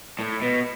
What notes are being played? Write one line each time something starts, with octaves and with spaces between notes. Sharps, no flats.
A2
B2